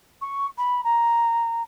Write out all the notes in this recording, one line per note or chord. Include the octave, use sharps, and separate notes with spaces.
C#6
B5
A#5